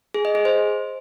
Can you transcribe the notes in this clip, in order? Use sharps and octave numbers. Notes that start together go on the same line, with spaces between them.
G#4
D#5
G#4
C5